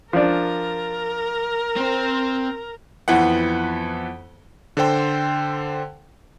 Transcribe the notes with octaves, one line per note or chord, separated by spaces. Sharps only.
F3 D4 A#4
C4 C5
F2 E3 B3 F#5
D3 A4 C5 G5 C6